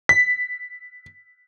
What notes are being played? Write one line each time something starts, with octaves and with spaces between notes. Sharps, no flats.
B6